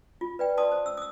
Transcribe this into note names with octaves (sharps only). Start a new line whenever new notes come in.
F4
B4 D5 G5
D5 A5 C6 D#6
C5
E6
D#6 E6